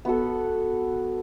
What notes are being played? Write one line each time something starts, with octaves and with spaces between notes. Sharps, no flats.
B3 F#4 A4